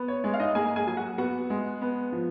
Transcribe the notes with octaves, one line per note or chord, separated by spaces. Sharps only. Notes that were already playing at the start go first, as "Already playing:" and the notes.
Already playing: B3
C#5
G#3 C#5
F5
D#4 D#5
A#3 G#4 G#5
G#4 G#5
F#3 G#5
F#4 F#5
B3 F#4 F#5
G#3
B3
F3